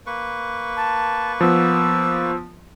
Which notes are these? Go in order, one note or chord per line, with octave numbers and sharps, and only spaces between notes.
A#3 B4 C#6
A5
F3 B3 E6